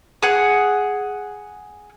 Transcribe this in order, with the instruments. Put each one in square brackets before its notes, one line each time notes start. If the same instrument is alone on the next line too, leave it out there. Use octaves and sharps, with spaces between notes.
[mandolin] G#4 F#5